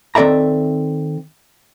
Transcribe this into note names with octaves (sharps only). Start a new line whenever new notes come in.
D#3 C4 A4 D5 E5 A#5